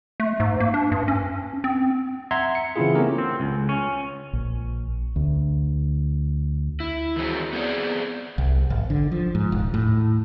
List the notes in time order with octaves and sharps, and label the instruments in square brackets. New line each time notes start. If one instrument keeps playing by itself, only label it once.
[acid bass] A3
G#2
A#3
D4
G2
C#4
C4
[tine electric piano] E5 F#5 A#5 C6 G#6
C#7
C#3 E3 C4 E4 F4 G#4
A3 B3 C#4 G4 A#4
[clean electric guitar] C4
C#2
C#4
[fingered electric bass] A#1
D2
[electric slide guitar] E4
D#3 E3 F#3 C4 F#4 G#4
B3 C4 G#4 D5
[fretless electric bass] C2
G#1
D3
F3
G#2
D#1
A2